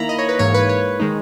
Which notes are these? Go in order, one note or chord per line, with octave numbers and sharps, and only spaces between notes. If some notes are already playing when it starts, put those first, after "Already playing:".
Already playing: D#3 A#3 E4 A#5 B5
D#5
C#5
B4
G#2 E3 A#3 C#5
B4
C#5
D#3 G#3 D#4